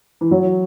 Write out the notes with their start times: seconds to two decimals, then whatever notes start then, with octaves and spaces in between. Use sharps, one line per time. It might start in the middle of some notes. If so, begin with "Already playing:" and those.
0.21 E3
0.31 F#3